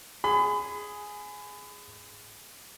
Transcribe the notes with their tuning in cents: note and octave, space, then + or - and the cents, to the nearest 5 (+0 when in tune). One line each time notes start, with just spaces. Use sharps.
G#4 +0 B5 +35